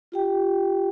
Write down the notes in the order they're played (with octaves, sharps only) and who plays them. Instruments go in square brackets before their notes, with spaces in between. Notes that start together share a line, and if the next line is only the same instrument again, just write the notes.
[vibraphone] F4 G4 G5